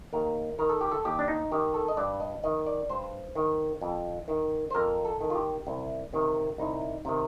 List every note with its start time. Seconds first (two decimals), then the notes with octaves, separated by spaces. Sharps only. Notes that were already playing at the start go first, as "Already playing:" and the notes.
0.13 D#2 A#4
0.58 D#3 A#4
0.69 A4
0.81 G4
0.91 A4
1.05 D#2 G4
1.19 D4
1.28 D#4
1.51 D#3 G4
1.74 A4
1.88 D#5
1.97 G2 D5
2.20 D#5
2.44 D#3 D#5
2.66 D5
2.89 G2 C5
3.35 D#3
3.81 F2
4.28 D#3
4.70 C5
4.75 F2 A#4
5.05 A4
5.21 D#3
5.30 F4
5.35 G4
5.67 C2
6.13 C3 D#3
6.58 C2 D#4
7.05 C3 D#3